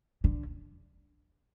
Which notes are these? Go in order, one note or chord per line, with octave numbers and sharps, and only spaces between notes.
D3